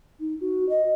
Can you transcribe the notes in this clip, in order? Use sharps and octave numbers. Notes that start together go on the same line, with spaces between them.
D#4
F#4
D#5